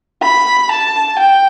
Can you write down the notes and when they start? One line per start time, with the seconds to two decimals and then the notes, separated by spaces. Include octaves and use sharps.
0.22 B5
0.71 A5
1.19 G5